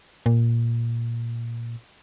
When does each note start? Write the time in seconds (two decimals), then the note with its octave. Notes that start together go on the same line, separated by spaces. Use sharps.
0.26 A#2